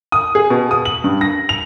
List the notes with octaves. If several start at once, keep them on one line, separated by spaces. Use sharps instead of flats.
D#6
G#4
B2
D#6
F#7
G2
A#6
F7